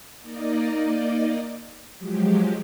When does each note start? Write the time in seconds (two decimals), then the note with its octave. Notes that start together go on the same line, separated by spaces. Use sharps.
0.21 A#3 D#4 D5 D#5
1.99 F3 F#3 G#3 G4